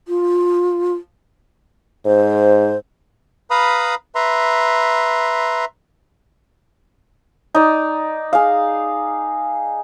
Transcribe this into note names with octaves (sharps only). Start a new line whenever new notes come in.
F4
G#2 C5
B4 F5 A#5 B5 D#6
B4 E5 A#5 C6
D#4 D5
G#4 F5